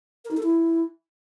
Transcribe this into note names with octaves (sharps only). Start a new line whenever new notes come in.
A#4
D#4
A4
E4